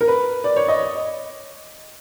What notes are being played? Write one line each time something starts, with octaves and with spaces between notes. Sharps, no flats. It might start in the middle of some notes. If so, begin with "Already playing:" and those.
A#4
B4
D5
C#5
D#5